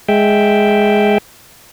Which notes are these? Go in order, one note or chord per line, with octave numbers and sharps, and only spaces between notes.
G#3 E5 G5